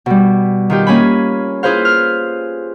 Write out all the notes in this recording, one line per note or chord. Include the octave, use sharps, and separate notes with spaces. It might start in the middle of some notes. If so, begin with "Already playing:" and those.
B2 G3
D#3 F4 G4
A#3 C#4 G#5 B5
E4 F4 G#4 B4 C5 F5
F6